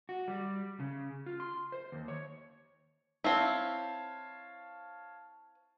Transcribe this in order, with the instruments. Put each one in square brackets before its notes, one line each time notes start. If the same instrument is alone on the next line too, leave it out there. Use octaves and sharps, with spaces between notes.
[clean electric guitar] F#4
G3
C#3
F4
C6
C5
D#2
C#5
[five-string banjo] C4 E4 [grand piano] C#5 F5 A5